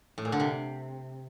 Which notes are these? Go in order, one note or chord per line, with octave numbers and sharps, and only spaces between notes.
A2
A#2
D3
C3